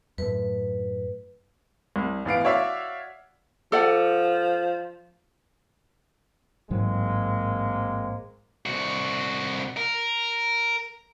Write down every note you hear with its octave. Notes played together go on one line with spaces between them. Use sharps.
F#2 A2 B4
C2
A1 B3 F5 D7
F#4 C#5 D5 E5 F5
F3 A4 D5 F#5
A1 G#2 F#3 G#3 A#3 C4
C2 F#4
A#4